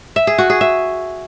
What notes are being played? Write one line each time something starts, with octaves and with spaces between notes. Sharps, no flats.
E5
G#4
F#4
G#4
E5